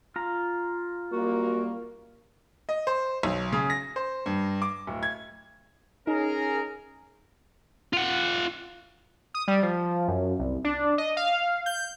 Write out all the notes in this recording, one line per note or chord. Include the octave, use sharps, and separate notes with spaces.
F4 A#5
F#2 G3 A#3 F#4
D#5
C5
B1
C#3
A#6
C5
G2
D6
D1
G#6
C#4 D#4 G#4 A#4
F4 F#5
D#6
G3
F3
F#2
C2
D4
D#5
F5
G6